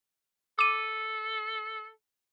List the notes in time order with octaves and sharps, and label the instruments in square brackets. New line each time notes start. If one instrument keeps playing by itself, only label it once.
[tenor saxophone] A4 [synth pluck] D6 D#7